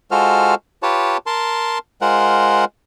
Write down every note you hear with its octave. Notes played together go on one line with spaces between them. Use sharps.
G#3 F4 F#4 A4 C5 F6
F4 G4 B4 C#5 A5
A#4 A5 C6
G#3 F4 A#4 C5 F#5